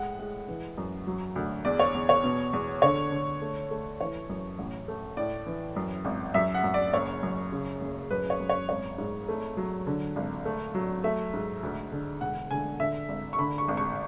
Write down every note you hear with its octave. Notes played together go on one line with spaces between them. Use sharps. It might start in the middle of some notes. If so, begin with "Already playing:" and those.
Already playing: A2 G#3 F#5
G#3
E3
F#2
F#3
D2
E2 D5
C#5
E2
C#5
B2
E2
D3 C#5
D3
A3
A3
E3 C#5
F#2
A1
A3
A2 D5
E3
F#2
G#1
F#2 E5
F#5
F#2
D5
F#1 C#5
F#2
C#3
F#1
F#2 B4
C#5
F#2
C#5
G#1 C#5
G#2
A3
F#3
D3
G#1
A3
F#3
A3 E5
G#2
D2
D3
E1 F#5
D3 G#5
D3 E5
G#1
C#6
D3 B5
C#6
G#1
C#6